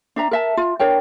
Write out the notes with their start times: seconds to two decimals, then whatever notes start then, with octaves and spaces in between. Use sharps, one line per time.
0.16 D4 E5 A#5
0.31 A#4 E5 A5
0.57 F4
0.79 D4 A#4 C#5 G5